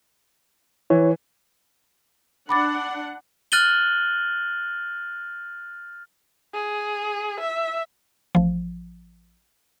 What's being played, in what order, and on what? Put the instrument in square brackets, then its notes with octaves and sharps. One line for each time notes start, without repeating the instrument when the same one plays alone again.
[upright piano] E3 [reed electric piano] E4 C#5
[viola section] D4 F#5 [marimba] B5 D6 A6
[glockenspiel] F6 F#6 A6 D#7 F#7 G7
[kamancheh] G#4
E5
[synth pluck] A1 F3